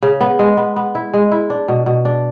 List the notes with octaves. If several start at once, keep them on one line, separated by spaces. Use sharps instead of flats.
C#3
B3
G#3
B3
B3
E4
G#3
E4
D4
B2
B2
D4